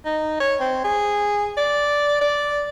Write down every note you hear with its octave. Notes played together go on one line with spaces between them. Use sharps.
D#4
C#5
C4
G#4
D5
D5